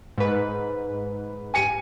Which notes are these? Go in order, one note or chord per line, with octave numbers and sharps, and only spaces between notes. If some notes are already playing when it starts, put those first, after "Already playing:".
G#2 B4
G#5 C#7 D#7